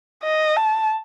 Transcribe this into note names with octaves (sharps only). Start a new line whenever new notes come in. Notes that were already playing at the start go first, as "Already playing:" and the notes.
D#5
A5